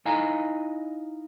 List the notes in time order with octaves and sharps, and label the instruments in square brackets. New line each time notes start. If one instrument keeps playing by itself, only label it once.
[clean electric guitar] D#4 E4 D#5 F5 G#5 A#5